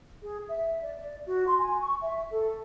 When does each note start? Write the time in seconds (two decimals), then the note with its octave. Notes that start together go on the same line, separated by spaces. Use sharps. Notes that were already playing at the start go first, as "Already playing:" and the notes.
0.21 G#4
0.47 E5
0.82 D5
0.98 D5
1.25 F#4
1.46 C6
1.59 G#5
1.80 C#6
2.00 E5
2.31 A4